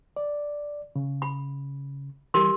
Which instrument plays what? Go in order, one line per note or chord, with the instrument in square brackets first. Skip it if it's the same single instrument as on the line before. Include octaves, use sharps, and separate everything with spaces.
[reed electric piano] D5
C#3
[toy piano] B5
[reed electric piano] E3 G3 [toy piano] G4 A#4 C6